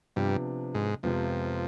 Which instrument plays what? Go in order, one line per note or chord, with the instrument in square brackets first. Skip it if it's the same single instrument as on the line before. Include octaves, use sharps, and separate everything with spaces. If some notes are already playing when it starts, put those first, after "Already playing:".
[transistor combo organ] G2 [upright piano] C3 F3 B3 D4
[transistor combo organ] G#2
[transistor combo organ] F2 [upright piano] C3 F3 G#3 B3